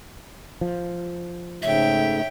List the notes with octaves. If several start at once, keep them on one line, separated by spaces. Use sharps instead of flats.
F3
G#2 C#3 A3 C#5 E5 G5